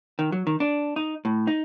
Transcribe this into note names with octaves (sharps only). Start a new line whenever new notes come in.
D#3
F#3
D#3
D4
D#4
A2
D#4